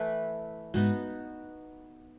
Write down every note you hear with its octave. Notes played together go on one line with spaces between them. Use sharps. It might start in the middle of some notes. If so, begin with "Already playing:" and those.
Already playing: E3 A3 E4 B4
G#2 B3 D#4 F#4